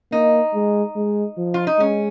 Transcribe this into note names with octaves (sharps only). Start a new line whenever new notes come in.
A#3 D#4
G#3
G#3
F3
F4
D#4
G#3 C#4